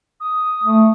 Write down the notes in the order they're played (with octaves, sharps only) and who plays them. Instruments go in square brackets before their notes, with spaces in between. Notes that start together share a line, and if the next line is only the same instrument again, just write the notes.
[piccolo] D#6
[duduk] A3